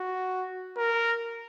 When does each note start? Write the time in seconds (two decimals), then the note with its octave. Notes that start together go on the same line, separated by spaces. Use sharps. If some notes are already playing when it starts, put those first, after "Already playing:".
Already playing: F#4
0.77 A#4